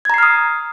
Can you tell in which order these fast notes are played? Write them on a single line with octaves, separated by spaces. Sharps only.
G#6 A#5 C7 F6 D#6